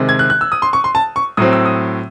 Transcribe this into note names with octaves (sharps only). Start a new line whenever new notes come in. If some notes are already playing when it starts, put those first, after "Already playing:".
Already playing: C3 D#3 G#3 C4
G#6
F#6
F#6
E6
D#6
C6
C#6
C6
A5
C#6
A2 F#3 C4 D#6
E6
D#6